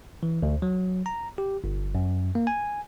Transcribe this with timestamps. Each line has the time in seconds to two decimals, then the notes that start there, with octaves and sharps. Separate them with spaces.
0.23 E3
0.42 D2
0.62 F#3
1.06 A#5
1.38 G4
1.64 G1
1.95 F#2
2.35 A#3
2.47 G#5